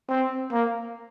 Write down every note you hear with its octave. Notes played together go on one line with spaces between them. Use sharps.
C4
A#3